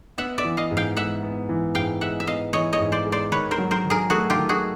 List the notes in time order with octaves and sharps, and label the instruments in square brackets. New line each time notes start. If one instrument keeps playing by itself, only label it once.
[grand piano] B3 [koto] E5 F#5
[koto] D5 E5
[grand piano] E3
[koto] D#5 F5
[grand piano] G#2
[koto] F5 G5
[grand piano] G#3 [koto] E5 F#5
[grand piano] B3
E3
[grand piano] G#2 [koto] F5 G5
[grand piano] G#3 [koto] E5 F#5
[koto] E5
[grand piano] B3 [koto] D#5 F5
[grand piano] E3 [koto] C#5 D#5
[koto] C#5 D#5
[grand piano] G#2
[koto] C5 D5
[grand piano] G#3
[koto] C5 D5
[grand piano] D#3 [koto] B4 C#5
[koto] A#4 C5
[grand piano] F#3
[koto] A#4 C5
[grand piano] D#3
[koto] G#4 A#4
[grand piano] A3 [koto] F#4 G#4
[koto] F4 G4
[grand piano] D#3
[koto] F#4 G#4